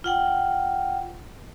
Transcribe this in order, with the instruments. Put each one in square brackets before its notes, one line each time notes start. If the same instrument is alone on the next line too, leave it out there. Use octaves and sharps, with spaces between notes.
[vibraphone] F4 F#5 G5